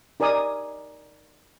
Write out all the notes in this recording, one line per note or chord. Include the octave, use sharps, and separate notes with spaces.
D#4 A#4 D5 G#5 D#6